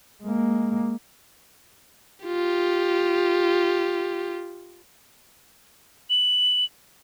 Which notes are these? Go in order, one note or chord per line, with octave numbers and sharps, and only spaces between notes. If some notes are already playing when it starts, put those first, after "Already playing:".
G#3 A#3
F4 G4
F#7